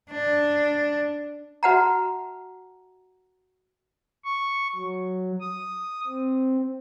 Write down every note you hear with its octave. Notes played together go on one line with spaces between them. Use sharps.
D4
F#4 B4 E5 F#5 A5 A#5
C#6
F#3
D#6
C4